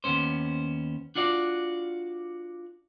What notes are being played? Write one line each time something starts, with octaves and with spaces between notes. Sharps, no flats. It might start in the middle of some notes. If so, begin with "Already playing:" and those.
D#2 A#2 B3 C#4 C5
D4 F4 F#4 D5